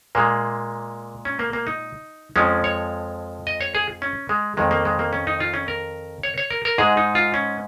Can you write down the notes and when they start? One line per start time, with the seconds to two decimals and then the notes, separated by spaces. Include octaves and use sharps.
0.15 A#2 G#3 A#3
1.25 C#4
1.39 A#3
1.53 A#3
1.67 D#4
2.36 F2 F3 G#3 C#4
2.64 C#5
3.47 D#5
3.61 C#5
3.75 G#4
4.02 C#4
4.29 G#3
4.57 F2 D#3 G#3
4.71 A#3
4.85 G#3
4.99 A#3
5.13 C#4
5.27 D#4
5.40 F4
5.54 C#4
5.68 A#4
6.23 C#5
6.38 C#5
6.50 A#4
6.65 A#4
6.78 G#2 G#3 G#4
6.97 D#4
7.15 F4
7.34 C#4